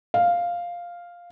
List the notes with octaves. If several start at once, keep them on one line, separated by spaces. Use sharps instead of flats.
F5